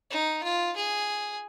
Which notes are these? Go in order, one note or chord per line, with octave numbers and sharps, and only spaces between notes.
D#4
F4
G#4